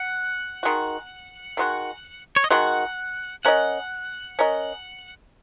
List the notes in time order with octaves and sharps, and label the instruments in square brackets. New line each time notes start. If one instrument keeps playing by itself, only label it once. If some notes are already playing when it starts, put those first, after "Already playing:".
Already playing: [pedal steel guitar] F#5
[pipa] D#3 G#3 F#4
D#3 G#3 F#4
[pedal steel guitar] C#5
D#5
[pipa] D#3 G#3 F#4 [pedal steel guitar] F#5
[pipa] C#4 A#4 D#5 [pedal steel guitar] F#5
[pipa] C#4 A#4 D#5